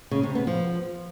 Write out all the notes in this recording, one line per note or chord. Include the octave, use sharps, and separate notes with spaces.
C#3
C3
B3
F3